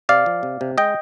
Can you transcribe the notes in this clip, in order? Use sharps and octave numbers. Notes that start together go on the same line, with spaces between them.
C3 D5 F5
F3
C3
C3
G#3 D#5 G5